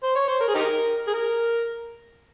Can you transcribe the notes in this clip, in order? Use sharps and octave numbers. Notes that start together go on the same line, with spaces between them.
C5
C#5
C5
A#4
G#4
D#4 G4 A#4
G#4
A#4